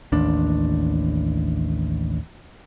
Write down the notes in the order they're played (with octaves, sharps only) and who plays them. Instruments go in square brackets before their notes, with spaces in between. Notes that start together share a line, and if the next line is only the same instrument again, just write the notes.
[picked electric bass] A1 D#2 D4